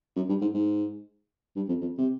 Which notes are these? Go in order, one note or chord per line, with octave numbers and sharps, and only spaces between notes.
F#2
G2
G#2
G#2
G2
F2
F2
C3